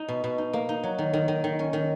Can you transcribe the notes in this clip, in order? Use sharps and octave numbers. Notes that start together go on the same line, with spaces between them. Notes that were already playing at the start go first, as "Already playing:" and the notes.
Already playing: D#4
B2
B2
D#4
A#3
D#4
F#3
D#3
D#3
D#3
D#3
C#4
D#3